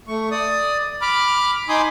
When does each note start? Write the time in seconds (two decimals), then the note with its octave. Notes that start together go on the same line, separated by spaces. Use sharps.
0.08 A3 C#6
0.31 D5 D#6
1.02 B5 D6 F6
1.69 D#4 G#5 B5 C6 D6 D#6